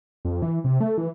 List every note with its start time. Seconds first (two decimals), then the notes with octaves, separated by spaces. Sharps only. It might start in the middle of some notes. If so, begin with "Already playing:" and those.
0.25 F2
0.42 E3
0.64 C3
0.80 A3
0.98 E3